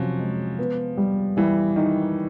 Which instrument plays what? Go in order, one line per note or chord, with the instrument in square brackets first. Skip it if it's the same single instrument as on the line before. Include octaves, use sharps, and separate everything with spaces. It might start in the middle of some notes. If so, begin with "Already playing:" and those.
Already playing: [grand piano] C3 C#4 [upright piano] F3 F#3
[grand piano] G#3
B3
G3
[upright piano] E3 [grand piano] G3
[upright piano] D#3 [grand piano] D#4